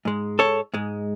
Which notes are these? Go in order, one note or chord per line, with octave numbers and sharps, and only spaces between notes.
G#2 G#3
A4 C#5
G#2 G#3